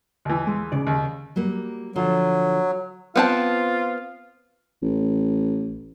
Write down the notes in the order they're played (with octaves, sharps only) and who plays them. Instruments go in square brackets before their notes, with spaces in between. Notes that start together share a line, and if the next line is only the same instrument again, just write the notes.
[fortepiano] D#2 E3
[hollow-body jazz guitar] G#3
C#3 D5
[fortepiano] D#2
[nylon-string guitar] F#3 G3 A#3
[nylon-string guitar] D3 F3 F4 [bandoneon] F#3
[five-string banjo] B3 C4 A5 [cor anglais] F4
[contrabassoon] A1